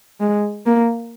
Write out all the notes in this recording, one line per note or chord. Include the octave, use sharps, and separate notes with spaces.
G#3
A#3